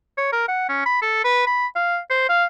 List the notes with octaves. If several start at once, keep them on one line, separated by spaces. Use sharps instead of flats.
C#5
A#4
F#5
C#4
B5
A4
B4
B5
F5
C5
F5